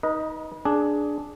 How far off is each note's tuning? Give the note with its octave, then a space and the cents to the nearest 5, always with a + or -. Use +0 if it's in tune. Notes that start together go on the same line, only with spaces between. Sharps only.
D#4 +15 B4 -35 D#5 +0
D4 +0 G#4 +10